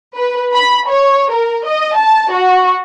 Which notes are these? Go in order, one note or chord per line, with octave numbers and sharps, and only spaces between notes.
B4
B5
C#5
A#4
D#5
A5
F#4